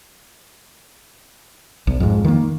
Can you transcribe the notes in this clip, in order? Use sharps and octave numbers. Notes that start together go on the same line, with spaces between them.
B1
F2 G#2
D#3 A#3